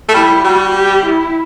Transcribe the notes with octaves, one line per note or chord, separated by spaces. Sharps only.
A3
G3 E4
G3 F#4
G4
E4